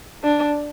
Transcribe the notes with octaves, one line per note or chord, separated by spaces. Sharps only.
D4